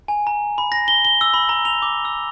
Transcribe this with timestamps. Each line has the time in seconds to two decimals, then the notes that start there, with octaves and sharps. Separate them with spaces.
0.08 G#5
0.27 A#5
0.58 B5
0.72 A#6
0.88 G7
1.05 G7
1.21 E6
1.34 B5
1.49 A#5
1.65 F7
1.82 D6
2.05 E6